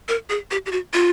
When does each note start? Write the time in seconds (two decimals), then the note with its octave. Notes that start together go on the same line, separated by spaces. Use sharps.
0.09 A#4
0.30 G#4
0.51 G4
0.66 G4
0.72 F#4
0.93 F4